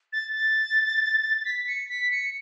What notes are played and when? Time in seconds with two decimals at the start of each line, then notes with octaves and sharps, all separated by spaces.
0.13 A6
0.34 A6
1.45 B6
1.67 C#7
1.89 B6
2.11 C#7